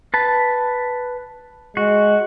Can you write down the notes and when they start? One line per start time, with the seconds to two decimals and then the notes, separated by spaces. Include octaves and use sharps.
0.14 B4 A5
1.77 G#3 F#4